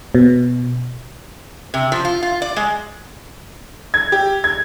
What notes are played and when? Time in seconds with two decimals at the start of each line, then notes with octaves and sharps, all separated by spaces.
0.15 B2
1.74 C3
1.92 F3
2.05 F4
2.23 F4
2.42 D5
2.56 G#3
3.94 G#6
4.12 G4
4.44 G#6